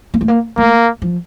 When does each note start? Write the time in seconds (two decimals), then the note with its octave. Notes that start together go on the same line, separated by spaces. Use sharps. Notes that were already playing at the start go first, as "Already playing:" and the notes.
0.14 A#3
0.21 A3
0.28 A#3
0.57 A3 A#3
1.02 F3